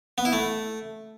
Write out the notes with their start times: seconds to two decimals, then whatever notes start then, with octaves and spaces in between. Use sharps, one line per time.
0.18 B3
0.25 E4
0.33 A3